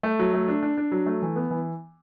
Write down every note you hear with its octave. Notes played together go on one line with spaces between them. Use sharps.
A3
F#3
A3
D4
D4
D4
F#3
A3
E3
B3
E3